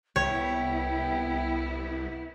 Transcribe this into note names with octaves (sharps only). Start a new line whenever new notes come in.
C2 B3 E4 C#5 G5